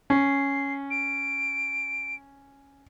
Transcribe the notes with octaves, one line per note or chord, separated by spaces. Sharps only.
C#4 C7
D7